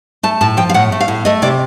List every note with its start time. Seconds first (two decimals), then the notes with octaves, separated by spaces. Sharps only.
0.23 A3 A5
0.41 A2 A5
0.57 F3 G5
0.69 F5
0.74 A2 F#5
0.92 A3
1.01 F5
1.08 A2
1.25 A3 D#5
1.42 C3 D5